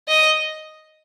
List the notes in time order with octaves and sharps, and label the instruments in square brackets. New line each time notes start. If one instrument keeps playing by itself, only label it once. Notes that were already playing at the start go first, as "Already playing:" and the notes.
[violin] D#5